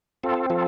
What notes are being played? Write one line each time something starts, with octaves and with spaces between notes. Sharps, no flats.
C4 F4 A4
F3 F4 A4